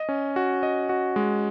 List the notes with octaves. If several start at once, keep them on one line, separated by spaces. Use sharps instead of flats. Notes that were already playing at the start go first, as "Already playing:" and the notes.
Already playing: D#5
C#4
F#4
D#5
F#4
G#3